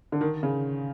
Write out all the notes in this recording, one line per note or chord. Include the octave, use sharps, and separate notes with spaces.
D3
D#3
C#3